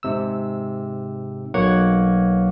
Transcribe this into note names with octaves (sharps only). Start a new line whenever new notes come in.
G#2 C3 E6
B1 F#3 A#3 C#5 F#5 G#6